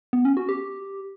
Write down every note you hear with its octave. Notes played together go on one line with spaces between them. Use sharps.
B3
C#4
F#4
G4